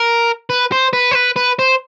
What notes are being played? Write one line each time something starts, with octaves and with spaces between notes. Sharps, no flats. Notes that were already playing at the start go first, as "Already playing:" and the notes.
Already playing: A#4
B4
C5
B4
C5
B4
B4
C5